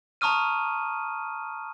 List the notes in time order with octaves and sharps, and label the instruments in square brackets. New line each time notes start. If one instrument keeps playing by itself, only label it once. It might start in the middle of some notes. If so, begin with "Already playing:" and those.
[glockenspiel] A5 A#5 C#6 D#6 F6 D#7